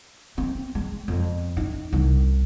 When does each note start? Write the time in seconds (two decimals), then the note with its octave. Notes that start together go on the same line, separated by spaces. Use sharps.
0.38 C4
0.75 G#3
1.08 F2
1.57 D#4
1.93 C2